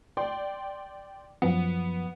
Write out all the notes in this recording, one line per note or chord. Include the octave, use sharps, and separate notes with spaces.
D5 G5 C6
F#2 F3 B3